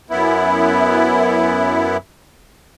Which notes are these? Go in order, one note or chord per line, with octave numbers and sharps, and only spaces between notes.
F#2 B3 E4